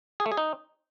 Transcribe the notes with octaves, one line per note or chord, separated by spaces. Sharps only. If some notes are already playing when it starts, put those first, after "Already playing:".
G#4
A3
G#4
D#4